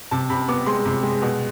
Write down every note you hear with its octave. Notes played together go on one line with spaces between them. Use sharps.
C3 A5
C3 B5
B3 D6
G#3 C6
C3
G#3
B2